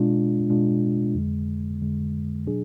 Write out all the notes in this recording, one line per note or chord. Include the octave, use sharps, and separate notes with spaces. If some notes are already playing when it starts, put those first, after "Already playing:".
Already playing: B2 G#3 D4 F4
B2 G#3 D4 F4
F2 D3 G#3
F2 D3 G#3
B2 F#3 D4 G#4